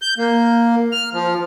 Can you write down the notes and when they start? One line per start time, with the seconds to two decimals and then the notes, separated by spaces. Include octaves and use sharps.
0.02 G6
0.18 A#3
0.92 F6
1.13 F3